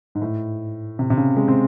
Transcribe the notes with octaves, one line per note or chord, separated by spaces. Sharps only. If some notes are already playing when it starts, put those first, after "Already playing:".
G#2
A2
C3
C3
C#3
G#3
C4